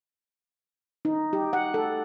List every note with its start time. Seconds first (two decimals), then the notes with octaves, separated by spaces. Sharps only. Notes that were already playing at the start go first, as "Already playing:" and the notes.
1.05 D#4
1.33 G4
1.53 F#5
1.74 A4